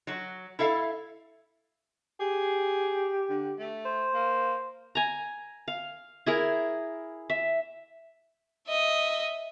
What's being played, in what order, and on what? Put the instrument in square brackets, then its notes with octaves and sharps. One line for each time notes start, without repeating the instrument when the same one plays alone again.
[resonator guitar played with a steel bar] F#3 F#4
E4 A4 E5 F5
[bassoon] G4 [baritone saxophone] G#4
[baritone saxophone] D3
A3
[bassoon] C5
[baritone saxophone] A#3
[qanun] G#5 A#5
F5
E4 G#4 A#4
E5
[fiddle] D#5 E5